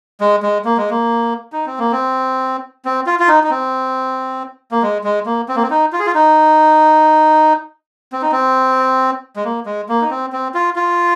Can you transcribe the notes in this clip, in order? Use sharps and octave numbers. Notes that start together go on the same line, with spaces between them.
G#3
G#3
A#3
G#3
A#3
D#4
C4
A#3
C4
C4
F4
F4
D#4
D#4
C4
A#3
G#3
G#3
A#3
C4
A#3
C4
D#4
F4
G#4
F4
D#4
C4
D#4
C4
G#3
A#3
G#3
A#3
D#4
C4
C4
F4
F4